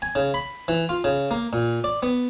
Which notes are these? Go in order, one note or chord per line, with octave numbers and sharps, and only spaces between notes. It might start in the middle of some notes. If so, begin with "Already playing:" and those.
G#5
C#3
B5
E3
F4
C#3
A#3
A#2
D5
B3